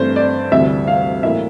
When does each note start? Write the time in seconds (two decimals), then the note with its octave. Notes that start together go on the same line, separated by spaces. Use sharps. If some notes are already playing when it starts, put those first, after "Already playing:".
Already playing: G2 E3 A3 C4 C5
0.16 D5
0.51 D2 C3 E3 G3 E5
0.87 F5
1.23 A2 E3 A#3 E4 E5